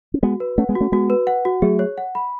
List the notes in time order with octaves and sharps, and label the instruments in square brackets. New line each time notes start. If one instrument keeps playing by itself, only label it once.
[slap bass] C#4
[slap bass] G#3 B3 [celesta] F#4
[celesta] B4
[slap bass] A3 C#4 [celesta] F#5
[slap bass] G#3 B3
[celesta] F#4
[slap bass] A3 C#4
[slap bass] G#3 B3 [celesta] F#4
[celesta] B4
F#5
F#4
[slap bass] F#3 A3 [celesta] G#4
[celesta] C#5
F#5
B5